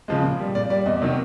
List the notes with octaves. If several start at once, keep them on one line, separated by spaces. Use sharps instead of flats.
C#3 F3 G#3
A#2
G3
A#2 D5
G3 D5
E2 D#5
C3 D#3 F#3